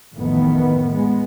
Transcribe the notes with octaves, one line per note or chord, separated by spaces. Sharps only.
A1 F2 A2 D#3 B3
G#3 B3